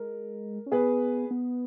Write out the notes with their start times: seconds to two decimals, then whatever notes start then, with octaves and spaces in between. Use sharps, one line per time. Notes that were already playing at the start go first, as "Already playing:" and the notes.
Already playing: G#3 A#4
0.66 C#4
0.72 B3 G#4 B4
1.31 B3